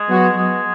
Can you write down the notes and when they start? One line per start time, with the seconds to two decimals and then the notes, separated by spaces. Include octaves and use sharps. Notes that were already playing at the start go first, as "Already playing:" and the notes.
Already playing: G#3
0.08 F#3 B3 F#4
0.37 G#3